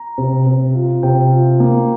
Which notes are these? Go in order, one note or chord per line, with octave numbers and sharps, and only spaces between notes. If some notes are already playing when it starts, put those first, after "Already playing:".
Already playing: A#5
C3
C3
F4
C3 G5
F4
A#3